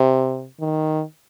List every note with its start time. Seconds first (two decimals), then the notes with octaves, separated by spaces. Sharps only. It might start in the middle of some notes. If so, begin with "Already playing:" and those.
Already playing: C3
0.60 D#3